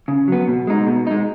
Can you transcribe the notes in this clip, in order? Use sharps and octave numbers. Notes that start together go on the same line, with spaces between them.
C#3
F#3 B3
B2
G#3 D#4
B2
G#3 D#4